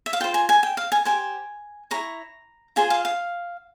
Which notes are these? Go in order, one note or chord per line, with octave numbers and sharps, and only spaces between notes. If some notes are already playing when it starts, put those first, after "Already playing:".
E5
F5
F4 C5 G5
G#5
G#5
G5
F5
G#5
G4 C5 G#5
E4 G#4 C#5 A#5
F4 G#4 C5 G#5
F5
F5